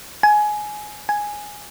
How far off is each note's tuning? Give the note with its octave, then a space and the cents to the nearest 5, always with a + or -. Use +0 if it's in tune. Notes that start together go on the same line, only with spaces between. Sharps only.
G#5 +15
G#5 +0